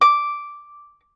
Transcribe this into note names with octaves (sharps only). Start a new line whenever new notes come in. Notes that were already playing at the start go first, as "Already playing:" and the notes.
D6